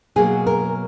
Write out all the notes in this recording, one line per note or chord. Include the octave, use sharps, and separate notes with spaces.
B2 F#3 A#3 G#4
A#4